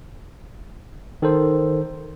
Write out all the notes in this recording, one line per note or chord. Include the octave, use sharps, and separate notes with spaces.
D#3 A4 C5